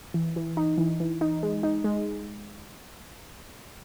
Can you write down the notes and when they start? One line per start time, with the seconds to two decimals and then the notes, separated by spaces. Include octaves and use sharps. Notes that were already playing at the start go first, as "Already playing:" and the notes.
0.14 E3
0.36 E3
0.57 D#4
0.78 E3
1.00 E3
1.21 D#4
1.43 G#3
1.63 D#4
1.84 G#3